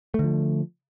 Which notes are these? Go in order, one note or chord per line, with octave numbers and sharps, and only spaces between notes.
D3 F3 A3